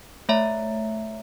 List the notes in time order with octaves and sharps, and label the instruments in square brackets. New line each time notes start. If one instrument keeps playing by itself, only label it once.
[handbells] A3 C#5 E5 A#5